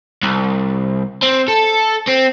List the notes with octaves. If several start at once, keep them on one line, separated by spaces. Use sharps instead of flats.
C2
C4
A4
C4